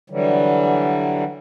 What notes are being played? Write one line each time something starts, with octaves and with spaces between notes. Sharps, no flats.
D3 E3 F#3 G3